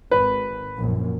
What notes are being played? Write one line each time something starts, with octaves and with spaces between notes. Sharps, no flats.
G#1 B4
A#1 F#2